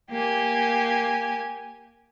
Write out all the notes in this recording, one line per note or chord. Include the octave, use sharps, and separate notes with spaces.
A#3 G4 G#5